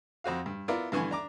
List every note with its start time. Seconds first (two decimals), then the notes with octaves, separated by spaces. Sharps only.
0.24 F2 C4 F#4 F5
0.46 G2
0.68 B3 E4 F4 A#4 D5
0.92 G2 D3 E3 B3 G#5 C#6
1.11 D4 A#5 D6